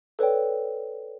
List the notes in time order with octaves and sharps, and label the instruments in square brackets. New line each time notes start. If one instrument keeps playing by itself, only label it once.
[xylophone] A4 B4 C#5 D5 G5